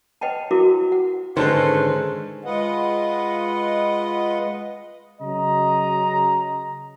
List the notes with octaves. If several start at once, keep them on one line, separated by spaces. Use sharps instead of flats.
B4 D#5 F#5 G5 A5
E4 F#4 A#4 F5 D6
F#5
G#2 D3 D#3 G#3 C#4 A4 B4 C5
G#3 F4 B4 D#5 F#5
C#3 F#3 D#5 A#5